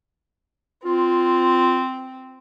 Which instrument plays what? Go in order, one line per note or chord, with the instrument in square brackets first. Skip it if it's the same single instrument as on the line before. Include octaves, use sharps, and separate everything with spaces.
[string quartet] C4 [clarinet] F4